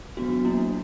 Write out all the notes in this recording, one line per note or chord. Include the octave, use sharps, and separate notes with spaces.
F#3 B3 D4 F#4
F#3 A#3 D4 E4